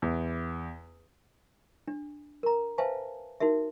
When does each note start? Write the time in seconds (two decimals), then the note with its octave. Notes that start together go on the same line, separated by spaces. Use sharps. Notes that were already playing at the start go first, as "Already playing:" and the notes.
0.02 E2
1.87 D4
2.43 A#4 A#5
2.78 B4 C5 E5 F5 G#5 A5
3.40 D#4 F#4 A#4 E5